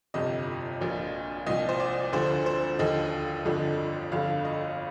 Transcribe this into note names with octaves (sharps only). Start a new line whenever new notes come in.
G1 F2 C3 F3 D#5
A#1 A#2 F3
C2 A#2 F3 D#5
C5
D5
D2 D3 F3 C5
C5
D#2 D3 F3 D#5
G1 F2 D3 F3
G1 F2 D3 F5
D#5